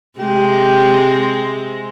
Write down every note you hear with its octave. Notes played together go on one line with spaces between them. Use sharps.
C3 G#3 C4 G4